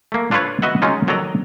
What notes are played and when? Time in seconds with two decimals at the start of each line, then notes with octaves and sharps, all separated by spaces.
0.12 A3 A#3
0.31 D4 F4 A4 B4 C#5
0.62 F#4 B4 D#5 E5 F#5
0.82 F#3 G#3 C#4 D#4 F4
1.07 D#3 F#3 A4 D5 D#5 A#5